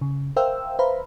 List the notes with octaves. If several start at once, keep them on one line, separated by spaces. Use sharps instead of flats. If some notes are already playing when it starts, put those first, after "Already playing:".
C#3
A#4 C5 E5 F5 G5 E6
B4 C5 E5 F5 A#5 B5